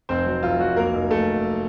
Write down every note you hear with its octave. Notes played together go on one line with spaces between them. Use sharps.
F1 C4 C5
F#3
F1 F4
F#3 F#4
F1 A#3 A#4
F1
F1 A3 A4